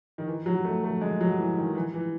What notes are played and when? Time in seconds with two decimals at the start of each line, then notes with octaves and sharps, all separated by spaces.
0.18 D#3
0.27 E3
0.46 F#3
0.65 A3
0.84 A3
1.01 G#3
1.21 F#3
1.38 E3
1.57 D#3
1.75 E3
1.94 E3